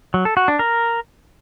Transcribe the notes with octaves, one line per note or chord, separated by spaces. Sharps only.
F#3
A4
F#4
D4
A#4